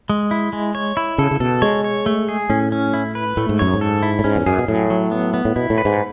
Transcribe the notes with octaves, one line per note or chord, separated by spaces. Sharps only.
G#3
E4
G#3
C#5
E4
C#3 A4
C#3
B2 A4
G#3 C#5
C#5
A3
G#4
A2 C#4
C#4
E4
B4
A2 A3
G#2
F#2 C#5
G#2
A4
E4
A2
G#2 C#4
E2
F#2 G#4
B2
A2 F#3
F#3
B3
B3
A2
B2 E4
A2
B4
G#2